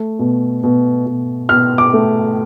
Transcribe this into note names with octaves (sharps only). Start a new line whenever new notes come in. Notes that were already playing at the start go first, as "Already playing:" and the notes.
Already playing: A3
B2
B2
B2
B2 F6
D6
A3